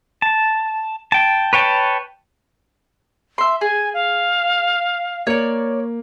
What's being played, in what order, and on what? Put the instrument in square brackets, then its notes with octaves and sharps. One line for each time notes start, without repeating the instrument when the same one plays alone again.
[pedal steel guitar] A5
G5 A5
B4 C#5 G5 A5
[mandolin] E5 C6
[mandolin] G#4 [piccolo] G#5
[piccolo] F5
[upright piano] A#3 [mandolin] C#5 D5